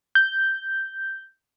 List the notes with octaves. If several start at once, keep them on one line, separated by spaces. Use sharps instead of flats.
G6